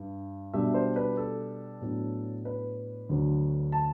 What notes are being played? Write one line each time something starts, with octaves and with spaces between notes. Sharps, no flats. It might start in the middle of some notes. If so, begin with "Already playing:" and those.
Already playing: G2
B2 G3 D4 E5
C5
B4
A4
A2 F#3 B3 D4
B4
D2 D3 F#3
A5